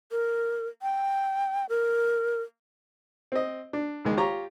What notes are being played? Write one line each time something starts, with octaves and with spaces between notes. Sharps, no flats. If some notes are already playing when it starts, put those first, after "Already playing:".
A#4
G5
A#4
C4 D#5
D4
C#2 D#3 G#3
F4 G4 C#5 A#5